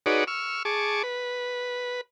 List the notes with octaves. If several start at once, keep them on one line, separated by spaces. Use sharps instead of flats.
D#4 F#4 G#4 B4 C#5 D5
C#6 E6 F6
G#4 A5 C#6 D6
B4